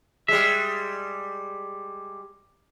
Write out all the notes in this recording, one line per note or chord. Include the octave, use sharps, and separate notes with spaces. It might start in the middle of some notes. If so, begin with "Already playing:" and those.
G3 G#3 E5